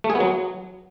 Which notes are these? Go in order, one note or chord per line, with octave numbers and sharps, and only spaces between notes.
A3
G#4
B3
F#3